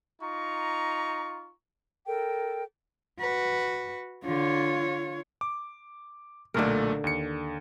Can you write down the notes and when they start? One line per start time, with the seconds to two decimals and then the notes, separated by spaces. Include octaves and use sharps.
0.22 D#4 F4 A#5 C#6
2.07 A4 A#4 G5
3.20 F#4 B4
4.25 D3 F4 C#5
5.41 D6
6.54 B1 A#2 D3 A3 A#4
7.04 D#2 C#7